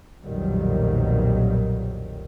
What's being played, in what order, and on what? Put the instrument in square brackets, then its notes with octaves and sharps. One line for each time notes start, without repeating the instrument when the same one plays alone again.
[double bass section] B1 F2 A#2 D#3 F#3 G3